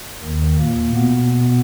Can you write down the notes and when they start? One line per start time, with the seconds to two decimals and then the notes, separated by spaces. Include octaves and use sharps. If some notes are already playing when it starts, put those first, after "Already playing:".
0.22 D#2 D#3
0.59 A#2 A#3
0.95 B2 B3